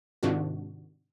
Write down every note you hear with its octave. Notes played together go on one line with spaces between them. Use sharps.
G#2 C3 D#3 D4 F4 F#4